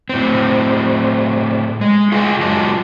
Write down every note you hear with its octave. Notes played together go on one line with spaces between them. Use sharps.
A2 C4
G#3
F4 G#4 D#5 E5 G5 G#5
F#3 G#3 F4 D#5 A5